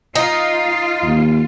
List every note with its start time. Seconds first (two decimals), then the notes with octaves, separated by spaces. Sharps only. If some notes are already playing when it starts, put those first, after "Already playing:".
0.16 D#4 F4
1.04 D#2